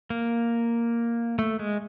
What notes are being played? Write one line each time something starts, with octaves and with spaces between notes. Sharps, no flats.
A#3
A3
G#3